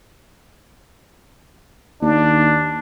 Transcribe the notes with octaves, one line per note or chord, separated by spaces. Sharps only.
D#2 D4